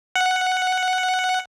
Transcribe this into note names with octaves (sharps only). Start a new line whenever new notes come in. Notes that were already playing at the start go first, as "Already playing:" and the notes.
F#5